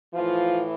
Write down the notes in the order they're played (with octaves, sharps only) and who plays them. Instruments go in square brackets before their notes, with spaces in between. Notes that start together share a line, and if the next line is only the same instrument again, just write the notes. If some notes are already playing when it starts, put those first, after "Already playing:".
[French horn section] A2 E3 F3 F4